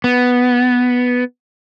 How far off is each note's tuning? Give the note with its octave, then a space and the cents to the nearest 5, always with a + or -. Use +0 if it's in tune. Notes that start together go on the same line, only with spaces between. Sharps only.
B3 +0